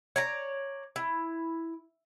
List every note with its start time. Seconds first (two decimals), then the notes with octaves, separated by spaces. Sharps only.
0.16 C#5 D5 A#5
0.96 E4